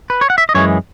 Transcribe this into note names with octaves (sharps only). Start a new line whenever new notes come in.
B4
C#5
F#5
E5
D#5
F#2 E3 G#3 C#5